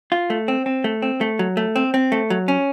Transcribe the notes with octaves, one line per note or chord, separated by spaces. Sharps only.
F4
A3
C4
C4
A3
C4
A3
F#3
A3
C4
C4
A3
F#3
C#4